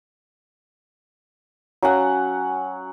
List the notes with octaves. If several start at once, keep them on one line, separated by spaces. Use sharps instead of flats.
F#3 C#4 F#5